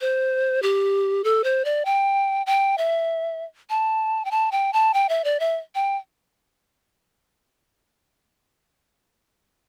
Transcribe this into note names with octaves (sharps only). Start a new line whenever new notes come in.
C5
G4
A4
C5
D5
G5
G5
E5
A5
G5
A5
G5
A5
G5
E5
D5
E5
G5